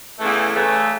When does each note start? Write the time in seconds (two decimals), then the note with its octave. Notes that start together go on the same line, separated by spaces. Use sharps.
0.19 E2 C#3 E3 A3
0.54 E2 C#3 E3 A3